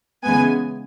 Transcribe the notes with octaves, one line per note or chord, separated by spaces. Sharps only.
C#3 E3 G#3 B3 G#5